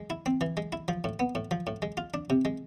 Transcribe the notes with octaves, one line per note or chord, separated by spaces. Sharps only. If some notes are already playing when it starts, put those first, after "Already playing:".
Already playing: G#3
E4
C4
E3
G#3
E4
F3
A2
B3
A2
F3
A2
G#3
F4
D4
C3
G#3